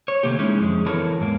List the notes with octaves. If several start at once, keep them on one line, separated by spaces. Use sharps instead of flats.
C#5
C3 D#3 A3 A#3 G4
G#3 C#4 D#4 E4
F2 G#3
E3 B3 E4 A4 A#4 C#5
E2 G#2 A#3